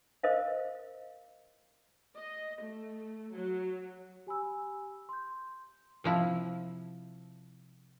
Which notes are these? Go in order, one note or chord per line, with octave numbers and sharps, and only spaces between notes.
A#4 C5 D#5 F5
D#5
A3
F#3
G4 G#5 B5 E6
C6 G6
C3 F3 E4